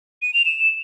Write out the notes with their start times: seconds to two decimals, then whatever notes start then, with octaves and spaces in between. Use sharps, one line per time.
0.22 D#7
0.34 F7
0.45 E7